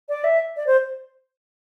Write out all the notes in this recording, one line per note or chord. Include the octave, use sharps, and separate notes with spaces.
D5
E5
D5
C5